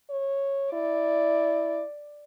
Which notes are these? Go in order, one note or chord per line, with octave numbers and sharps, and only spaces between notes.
C#5
E4 D5